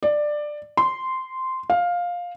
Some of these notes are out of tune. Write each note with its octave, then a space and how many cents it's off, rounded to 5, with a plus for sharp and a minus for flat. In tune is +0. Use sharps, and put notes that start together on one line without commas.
D5 +15
C6 -10
F5 +10